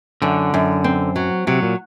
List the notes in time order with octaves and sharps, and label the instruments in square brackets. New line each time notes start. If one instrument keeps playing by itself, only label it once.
[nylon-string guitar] F#2 [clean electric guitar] D3
[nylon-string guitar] F#2
C4
F#3
[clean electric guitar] C3 [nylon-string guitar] F#3
[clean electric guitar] A#2